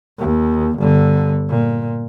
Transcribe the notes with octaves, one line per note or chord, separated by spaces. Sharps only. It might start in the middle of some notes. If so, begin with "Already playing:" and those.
D#2
G1 D3
A#2